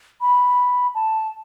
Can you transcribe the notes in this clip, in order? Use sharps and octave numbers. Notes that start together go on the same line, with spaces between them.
B5
A5